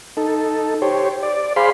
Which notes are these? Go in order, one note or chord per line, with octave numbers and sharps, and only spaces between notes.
D#4 A4
G4 C5 C#5
D5
G#4 C5 F5 B5 C6